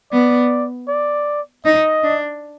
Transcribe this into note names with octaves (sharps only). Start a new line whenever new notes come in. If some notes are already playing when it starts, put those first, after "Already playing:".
B3 D5
D5
D#4 D#5
D4